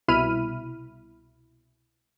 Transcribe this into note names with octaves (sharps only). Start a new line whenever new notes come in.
C2 B2 E4 B5 F6 D#7